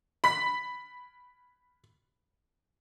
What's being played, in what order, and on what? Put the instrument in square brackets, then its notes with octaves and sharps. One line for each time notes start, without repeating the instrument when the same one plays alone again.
[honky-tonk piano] B5 B6